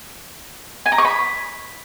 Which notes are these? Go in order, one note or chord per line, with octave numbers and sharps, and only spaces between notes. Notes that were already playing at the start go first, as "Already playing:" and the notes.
G#5
A#5
C#6
B5